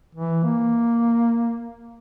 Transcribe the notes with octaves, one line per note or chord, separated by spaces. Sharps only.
E3
A#3